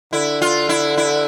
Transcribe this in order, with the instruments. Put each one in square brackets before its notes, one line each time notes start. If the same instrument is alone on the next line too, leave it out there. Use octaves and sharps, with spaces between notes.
[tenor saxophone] D3 [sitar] E4
[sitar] F4
E4
E4